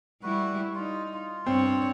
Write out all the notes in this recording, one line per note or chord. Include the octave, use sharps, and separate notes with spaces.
G3 E4 F#4 B4
D#4 F4
F4
G2 C4 C#5